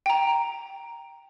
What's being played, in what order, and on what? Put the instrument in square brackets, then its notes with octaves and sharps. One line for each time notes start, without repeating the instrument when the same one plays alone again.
[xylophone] G5 A#5